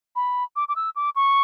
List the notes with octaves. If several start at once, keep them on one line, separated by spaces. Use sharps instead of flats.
B5
D6
D6
E6
D6
C#6